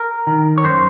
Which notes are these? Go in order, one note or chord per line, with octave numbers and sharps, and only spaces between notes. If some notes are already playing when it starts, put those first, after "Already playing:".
Already playing: A#4
D#3
C#5
F#2 C5